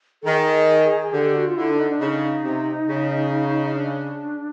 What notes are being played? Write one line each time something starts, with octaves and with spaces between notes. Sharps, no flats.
A4
D#3 G#4
D3 G4
F#4
F4
D3 E4
D4
D#4
D4
C#3 D#4
C3
C#3
D4